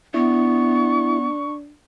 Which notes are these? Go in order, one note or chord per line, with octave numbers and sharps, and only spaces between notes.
B3 D4 E4 C#6